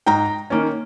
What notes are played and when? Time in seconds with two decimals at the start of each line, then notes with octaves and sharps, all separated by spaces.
0.06 G#2 G5 A#5
0.50 D#3 A#3 C#4